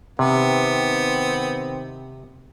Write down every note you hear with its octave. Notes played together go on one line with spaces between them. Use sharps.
C3 D#3 B3 C4